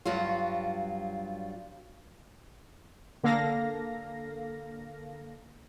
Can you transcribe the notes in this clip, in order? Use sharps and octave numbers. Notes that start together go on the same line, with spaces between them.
G2 F#3 G3 F4
D3 A#3 A4 F5 A#6